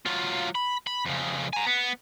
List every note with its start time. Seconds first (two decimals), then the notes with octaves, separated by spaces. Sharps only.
0.06 F#3 F4
0.55 B5
0.87 B5
1.05 F2 C#3
1.53 G#5 A#5
1.67 B3